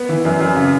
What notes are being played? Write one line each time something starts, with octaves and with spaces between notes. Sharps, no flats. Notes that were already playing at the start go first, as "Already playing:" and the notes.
Already playing: B3
E3
F#2
F#2
C#3